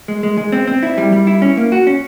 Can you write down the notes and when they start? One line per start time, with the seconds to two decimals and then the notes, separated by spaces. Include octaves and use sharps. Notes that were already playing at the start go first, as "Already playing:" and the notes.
0.08 G#3
0.23 G#3
0.37 G#3
0.52 C4
0.67 C4
0.83 E4
0.98 G3
1.12 G3
1.27 E4
1.42 C#4
1.57 A#3
1.72 F#4
1.87 C#4